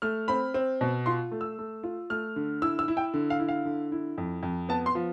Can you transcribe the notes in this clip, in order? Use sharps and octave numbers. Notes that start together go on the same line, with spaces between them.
A3 F6
C4 B5
C4
B2
F4 C6
A3
E6
A3
F4
A3 F6
D3
E4 E6
E6
E4
G5
D3
F5
E4
F5
D3
E4
F2
F2
B3 A5
C6
F3